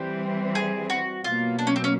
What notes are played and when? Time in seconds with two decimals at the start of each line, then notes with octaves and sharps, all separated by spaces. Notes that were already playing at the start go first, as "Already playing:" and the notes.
Already playing: E3 G3 C4 G4
0.55 G#4
0.90 F#4
1.24 B2 F#3 A#3 F4
1.59 D4
1.67 C#4
1.76 C4
1.84 C#4